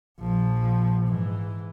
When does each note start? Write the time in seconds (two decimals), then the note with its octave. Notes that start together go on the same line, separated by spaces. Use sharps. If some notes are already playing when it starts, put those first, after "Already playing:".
0.19 A#1 F3
1.08 G#2 E3